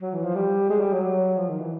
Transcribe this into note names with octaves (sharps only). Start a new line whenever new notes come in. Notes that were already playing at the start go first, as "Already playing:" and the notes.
F#3
E3
F3
G3
G#3
G3
F#3
F3
D#3
E3